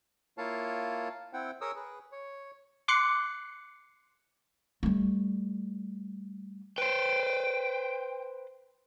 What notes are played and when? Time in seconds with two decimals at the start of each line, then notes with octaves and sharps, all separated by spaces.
0.38 A#3 E4 F4 C#5 F5 A5
1.33 C4 E4 F#5 G5
1.61 G#4 A#4 C#5 D#6 E6
1.76 G#4 B4
2.12 C#5
2.88 C6 D6 F#6 C7 C#7
4.83 G3 A3
6.78 B4 C5 G5